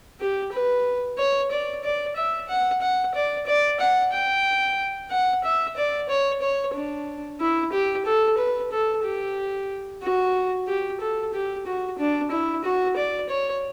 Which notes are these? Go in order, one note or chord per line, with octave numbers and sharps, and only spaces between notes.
G4
B4
C#5
D5
D5
E5
F#5
F#5
D5
D5
F#5
G5
F#5
E5
D5
C#5
C#5
D4
E4
G4
A4
B4
A4
G4
F#4
G4
A4
G4
F#4
D4
E4
F#4
D5
C#5